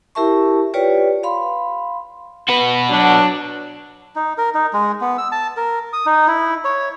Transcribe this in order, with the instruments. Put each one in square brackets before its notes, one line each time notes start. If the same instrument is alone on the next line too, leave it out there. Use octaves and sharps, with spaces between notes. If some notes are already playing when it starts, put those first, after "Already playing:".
[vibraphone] E4 G4 A#4 E5 A5 C#6
F4 G4 B4 C#5 D5 G5
F5 B5 C6
[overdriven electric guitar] F#4 B4
[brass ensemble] F#3 D4
[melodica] D#4
A#4
D#4
G#3
B3
E6
A5
A#4
D#6
D#4
E4
C#5